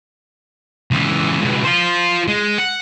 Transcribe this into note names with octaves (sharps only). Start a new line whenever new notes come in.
C#2 E3
C#2 B2
F4 C5
G#3
F#5